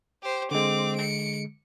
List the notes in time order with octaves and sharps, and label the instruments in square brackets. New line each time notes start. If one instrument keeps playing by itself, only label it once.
[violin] G4 C5
[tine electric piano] D3 G#3 [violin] C4 D6
[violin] C#7 D7